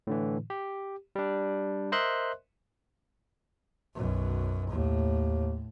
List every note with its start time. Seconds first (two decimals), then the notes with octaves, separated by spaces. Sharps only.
0.07 A2 D3 E3
0.50 G4
1.15 G3 D4
1.92 A#4 C5 D#5 E5 C6 F#6
3.95 B1 F#2
4.70 D#2 A2